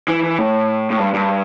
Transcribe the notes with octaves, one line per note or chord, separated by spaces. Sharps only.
E3
E3
A2
A2
G2
G2